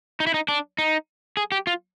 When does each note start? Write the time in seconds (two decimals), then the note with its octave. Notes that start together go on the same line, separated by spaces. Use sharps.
0.20 D#4
0.27 E4
0.34 D#4
0.48 D4
0.78 D#4
1.37 G#4
1.52 G4
1.67 F4